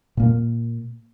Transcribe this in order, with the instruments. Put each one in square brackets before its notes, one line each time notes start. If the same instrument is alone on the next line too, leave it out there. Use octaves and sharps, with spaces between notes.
[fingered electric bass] A#2 A#3